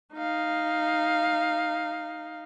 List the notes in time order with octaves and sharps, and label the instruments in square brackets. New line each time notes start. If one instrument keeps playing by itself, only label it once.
[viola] D#4 F5